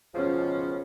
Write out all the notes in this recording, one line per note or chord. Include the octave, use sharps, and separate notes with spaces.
C#2 B2 F3 C#4